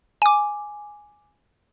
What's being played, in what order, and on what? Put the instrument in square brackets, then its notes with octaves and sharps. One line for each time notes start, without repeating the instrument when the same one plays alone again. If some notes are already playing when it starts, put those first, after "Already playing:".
[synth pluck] G#5 D6